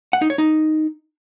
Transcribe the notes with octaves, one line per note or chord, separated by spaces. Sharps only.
F#5
D#4
C#5
D#4